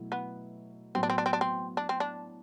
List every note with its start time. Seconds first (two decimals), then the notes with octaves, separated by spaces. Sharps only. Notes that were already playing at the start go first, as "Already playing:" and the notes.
Already playing: B2 F#3 A3 E4
0.12 B3
0.95 A2 F#3 B3 C4
1.03 D4
1.10 C4
1.18 D4
1.26 C4
1.33 D4
1.41 C4
1.77 D4
1.89 C4
2.00 D4